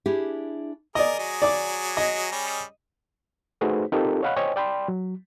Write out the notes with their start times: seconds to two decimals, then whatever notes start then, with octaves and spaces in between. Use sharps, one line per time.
0.06 D4 E4 G4 G#4
0.95 G#4 A#4 D5 D#5
1.19 F#3 G#4
1.42 D5 D6
1.97 D#5
2.32 G3 C#4 G#4
3.61 A3 D#4 F#4 G#4 B4 C5
3.92 C4 D#4 F4 G4 A4 A#4
4.23 C#5 D#5 F5 F#5 B5 F#6
4.36 C5 C#5 D#5 G5 G#5
4.56 D5 G5 B5 C6
4.88 F#3